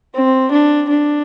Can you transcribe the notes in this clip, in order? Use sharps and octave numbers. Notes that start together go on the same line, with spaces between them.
C4
D4
D4